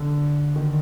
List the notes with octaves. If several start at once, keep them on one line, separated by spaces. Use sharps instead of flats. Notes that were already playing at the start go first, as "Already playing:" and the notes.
Already playing: D3
D#3